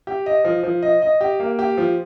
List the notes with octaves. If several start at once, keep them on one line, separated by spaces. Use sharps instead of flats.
G4
D#5
F3
F3
D#5
D#5
G4
A#3
G4
F3